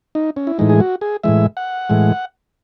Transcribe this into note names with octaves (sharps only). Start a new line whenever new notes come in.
D#4
C#4
E4
A2 E3 G#3 D#4
G#4
F#4
G#4
A2 E3 G#3 E5
F#5
A2 E3 G#3